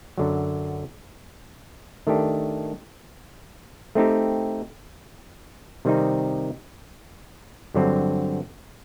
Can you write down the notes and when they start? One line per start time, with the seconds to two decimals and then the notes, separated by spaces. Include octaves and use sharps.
0.18 F#2 D3 F#3
2.07 D#3 A3 D4 G4
3.95 A3 C4 D#4 G4
5.85 C3 D#3 G3 C4 D#4
7.74 G2 D3 F#3 C4